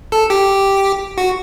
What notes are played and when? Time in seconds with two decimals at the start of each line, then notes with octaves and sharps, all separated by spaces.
0.12 A4
0.30 G4
1.17 F#4